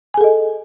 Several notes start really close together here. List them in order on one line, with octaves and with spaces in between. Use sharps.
G#5 G#4 A4 D#5